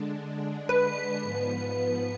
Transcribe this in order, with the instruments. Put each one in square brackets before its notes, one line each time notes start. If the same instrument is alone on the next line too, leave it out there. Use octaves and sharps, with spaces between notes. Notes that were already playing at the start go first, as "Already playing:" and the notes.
Already playing: [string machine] D3 G#3 D4
[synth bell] B4
[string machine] G#2 F3 B3